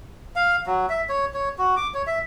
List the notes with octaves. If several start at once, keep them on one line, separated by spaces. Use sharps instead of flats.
F5
F#3
E5
C#5
C#5
F#4
D6
C#5
E5